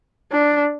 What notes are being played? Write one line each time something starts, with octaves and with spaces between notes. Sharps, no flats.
D4